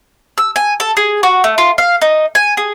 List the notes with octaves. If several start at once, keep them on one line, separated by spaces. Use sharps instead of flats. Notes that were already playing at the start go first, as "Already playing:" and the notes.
E6
G#5
A4
G#4
F#4
A3
F4
F5
D#4
G#5
G#4